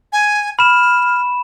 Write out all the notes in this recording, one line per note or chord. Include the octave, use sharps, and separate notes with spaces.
G#5
B5 F6 E7